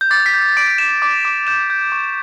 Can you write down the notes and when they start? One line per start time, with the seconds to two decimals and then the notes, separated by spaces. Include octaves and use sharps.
0.01 G6
0.11 D6 A6
0.26 B6
0.34 G6
0.57 D6 D7
0.78 G6 E7
1.02 D6
1.25 D6
1.47 G6 E7
1.70 G6
1.92 C#6